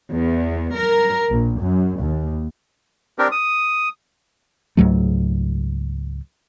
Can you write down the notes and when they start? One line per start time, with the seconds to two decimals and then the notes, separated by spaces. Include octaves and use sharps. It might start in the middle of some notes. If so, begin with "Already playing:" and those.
0.10 E2
0.77 A#4
1.30 A#1
1.60 F#2
2.00 D#2
3.18 C4 D4 G4 A#4
3.31 D#6
4.77 C#2 G#2 F#3 A3